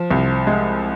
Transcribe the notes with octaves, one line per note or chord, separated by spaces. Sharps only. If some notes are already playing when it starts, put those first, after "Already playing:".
Already playing: F3
C2
G#3